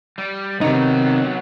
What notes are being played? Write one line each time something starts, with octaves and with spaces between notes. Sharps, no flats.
G3
C3 D#3 F#3 B3 D#4